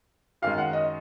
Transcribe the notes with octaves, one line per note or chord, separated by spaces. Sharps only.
F#2 D#3 G#3 F5
F#5
D#5